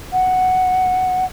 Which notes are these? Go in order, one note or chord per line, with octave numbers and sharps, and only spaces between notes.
F#5